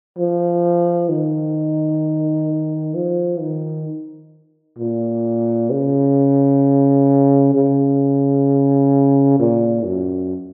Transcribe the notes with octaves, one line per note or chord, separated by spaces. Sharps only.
F3
D#3
F3
D#3
A#2
C#3
C#3
A#2
F#2